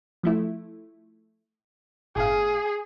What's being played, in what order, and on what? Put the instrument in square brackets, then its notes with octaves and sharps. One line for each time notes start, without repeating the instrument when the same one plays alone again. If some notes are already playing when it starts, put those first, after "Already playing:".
[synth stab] F3 A3 E4
[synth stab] G1 A2 F5 [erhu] G#4